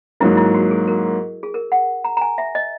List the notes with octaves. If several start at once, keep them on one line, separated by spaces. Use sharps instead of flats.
G#2 F#3 A#3 E4
E4
F#4
G#4
A#4
G#4
A#4
F#5
A#5
A#5
G#5
E5
D#5